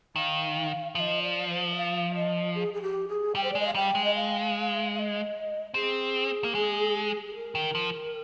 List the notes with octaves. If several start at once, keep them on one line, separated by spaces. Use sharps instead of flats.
D#3 F5
F3 D#5 F5
D5
C5
F5
D#5
G#4
G#4
G4
G#4
G3 G5
C5
D5
G#3 D#5
F5
G3 G5
G#3
D#5
F5
F5
D#5
C4 G#4
A#3
G#3
G#4
A#4
D#3
F3